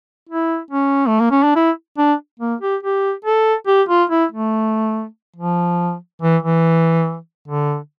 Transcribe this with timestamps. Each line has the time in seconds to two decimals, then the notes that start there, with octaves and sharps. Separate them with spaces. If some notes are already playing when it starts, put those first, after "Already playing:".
0.29 E4
0.70 C#4
1.08 A3
1.19 A#3
1.31 C#4
1.43 D4
1.56 E4
1.98 D4
2.40 A#3
2.61 G4
2.83 G4
3.25 A4
3.67 G4
3.89 F4
4.10 E4
4.31 A3
5.36 F3
6.22 E3
6.43 E3
7.48 D3